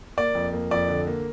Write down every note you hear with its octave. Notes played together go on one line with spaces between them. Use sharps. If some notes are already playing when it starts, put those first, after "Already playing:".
A#3 D5
F2
A#3
F2 D5
D3
A#3